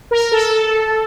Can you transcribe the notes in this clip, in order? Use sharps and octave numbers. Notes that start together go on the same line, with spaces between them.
A#4
A4